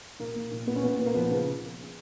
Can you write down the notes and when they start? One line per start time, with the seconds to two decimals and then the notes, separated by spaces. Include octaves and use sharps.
0.20 A#2 A#3
0.36 A#2
0.52 A#2
0.67 A#2 B3
0.76 C#4
0.83 A#2 B3
0.99 A#2
1.06 A#3
1.14 F3 B3
1.31 C#3